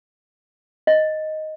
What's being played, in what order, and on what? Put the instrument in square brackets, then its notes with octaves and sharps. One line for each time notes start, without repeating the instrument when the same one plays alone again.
[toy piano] D#5